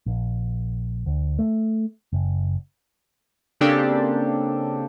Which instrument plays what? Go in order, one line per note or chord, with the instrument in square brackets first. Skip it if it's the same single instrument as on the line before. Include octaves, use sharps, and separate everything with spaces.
[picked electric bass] A#1
D2
A3
F#1
[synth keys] C#3 A#3 C4 D4 G4 A4